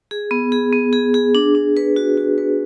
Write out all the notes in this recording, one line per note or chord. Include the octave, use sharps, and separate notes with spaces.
G#4
B3
G#4
B3
G#4
G#4
D4
D4
B4
F#4
F#4
B4